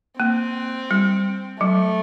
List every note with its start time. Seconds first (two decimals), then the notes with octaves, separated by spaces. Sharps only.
0.20 A#3 C4
0.91 G3
1.61 F#3 A3